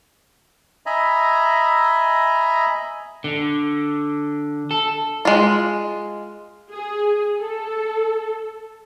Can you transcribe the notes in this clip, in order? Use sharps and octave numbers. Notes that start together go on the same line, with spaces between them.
D#5 E5 G#5 A#5 B5
D3
A4
G#3 F4
G#4
A4